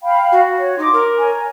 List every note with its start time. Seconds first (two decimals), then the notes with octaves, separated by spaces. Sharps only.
0.03 F5 G5 B5
0.32 F#4
0.59 C#5
0.79 D#4 C6 D6
0.93 A#4
1.19 C#5 G#5 A#5